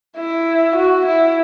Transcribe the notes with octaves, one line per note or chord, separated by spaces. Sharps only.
E4
F#4
E4